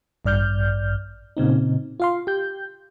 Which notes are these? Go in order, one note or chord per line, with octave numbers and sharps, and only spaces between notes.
A1 G2 D5 F6 G6
A#2 C#3 C4 D#4
F4 F5 C6
G4 G6